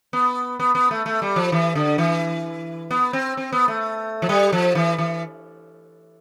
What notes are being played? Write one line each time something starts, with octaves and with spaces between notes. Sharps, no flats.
B3
B3
B3
A3
A3
G3
F3
E3
D3
E3
B3
C4
C4
B3
A3
F3
G3
F3
E3
E3